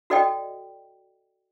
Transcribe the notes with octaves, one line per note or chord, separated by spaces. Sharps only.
F#4 A4 D5 D#5 G5